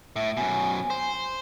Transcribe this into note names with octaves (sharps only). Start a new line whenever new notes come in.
A2 E5
F#2 B2 G#5
C5